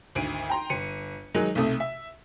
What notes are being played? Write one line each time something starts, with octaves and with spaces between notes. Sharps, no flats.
G#1 D2 D7 D#7
G5 A#5 C6
G1 C#7 D#7
D#3 F#3 G#3 D#4
B1 C3 A3 D#6
E5